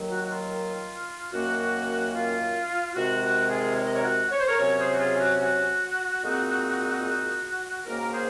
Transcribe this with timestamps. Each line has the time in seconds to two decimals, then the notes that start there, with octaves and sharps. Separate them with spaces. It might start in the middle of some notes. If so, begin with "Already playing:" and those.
Already playing: D#2 D#3 F#3
0.09 F#4
0.24 F#4
0.30 F4
1.32 F#2 D#3 A#3 C#4 F#4
2.14 F4
2.95 C3 D#3 G#3 F#4
3.23 F#4
3.50 F4 G#4
3.77 C#5
3.86 D#5
3.95 A#4 C#5
4.04 F#4
4.32 C#5
4.40 C5
4.48 A#4 C#5
4.59 C3 F#3 C#4 A#4 C#5
4.79 G#4 C5
4.94 F#4
4.99 F4 G#4
5.20 F#4
5.40 F#4
6.22 A#2 G#3 C4 D#4
7.04 F#4
7.85 G#2 D#3 A#3 C#4 F#4 A#4
8.13 G#4 C5